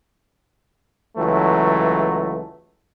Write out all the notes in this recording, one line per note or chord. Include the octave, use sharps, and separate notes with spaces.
C#2 E3 F#3 A3